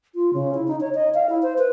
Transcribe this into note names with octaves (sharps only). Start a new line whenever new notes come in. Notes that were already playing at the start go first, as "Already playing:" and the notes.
F4
C#3
E4
D#4
C#5
D#5
F5
E4
C5
B4